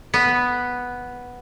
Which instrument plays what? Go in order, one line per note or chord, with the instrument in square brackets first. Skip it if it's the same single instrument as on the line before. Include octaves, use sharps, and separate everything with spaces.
[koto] B3